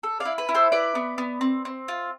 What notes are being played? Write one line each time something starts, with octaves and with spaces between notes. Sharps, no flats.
A4
D5 F5
E4
B4
E4
A4 C5
E4 B4 D5
B3
B3
C4
C4
F4